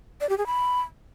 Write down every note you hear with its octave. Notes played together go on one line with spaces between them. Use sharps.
D5
G4
G#4
B5